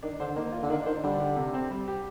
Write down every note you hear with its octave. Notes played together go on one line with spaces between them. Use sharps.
D#3 D4
D3 C5
D#3 A#3
F4
D3
D#3 D4
D#3 C5
D3 G3
G4
C3
C4
G3
G4